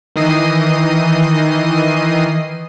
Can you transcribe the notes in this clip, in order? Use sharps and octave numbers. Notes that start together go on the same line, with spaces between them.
D#3 E3 D#5 C7 D#7